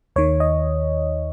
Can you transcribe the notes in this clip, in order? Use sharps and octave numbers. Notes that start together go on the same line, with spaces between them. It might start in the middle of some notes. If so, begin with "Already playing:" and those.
D#2 D#3 C#5
D#5